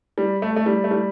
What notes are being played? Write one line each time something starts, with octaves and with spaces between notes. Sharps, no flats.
G3
A3
A3
G3
A3
G3